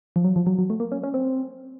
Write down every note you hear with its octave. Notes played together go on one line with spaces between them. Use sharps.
F3
F#3
F3
F#3
F#3
A3
A#3
C#4
C#4
C4